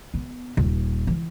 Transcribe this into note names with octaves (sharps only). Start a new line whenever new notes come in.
B3
D#1
E3